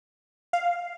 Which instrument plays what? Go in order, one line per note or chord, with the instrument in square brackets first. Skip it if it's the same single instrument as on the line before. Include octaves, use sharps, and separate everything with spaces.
[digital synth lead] F5